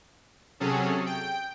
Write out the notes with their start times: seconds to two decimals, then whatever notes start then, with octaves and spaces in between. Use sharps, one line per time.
0.60 C3 F#3 C#4 G#4 A4
1.06 G5